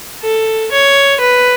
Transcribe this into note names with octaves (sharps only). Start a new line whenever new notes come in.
A4
C#5
B4